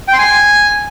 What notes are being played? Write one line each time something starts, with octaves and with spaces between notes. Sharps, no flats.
G5
C6
G#5